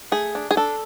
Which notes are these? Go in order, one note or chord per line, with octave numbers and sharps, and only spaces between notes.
A3 G#4
D4
G#4
D4 A4